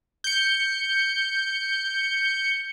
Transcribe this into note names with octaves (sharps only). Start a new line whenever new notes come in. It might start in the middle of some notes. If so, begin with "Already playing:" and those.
G6 C#7